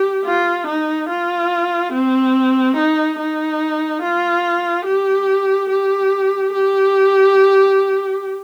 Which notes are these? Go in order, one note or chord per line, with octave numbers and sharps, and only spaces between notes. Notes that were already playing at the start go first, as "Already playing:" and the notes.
Already playing: G4
F4
D#4
F4
C4
D#4
D#4
F4
G4
G4
G4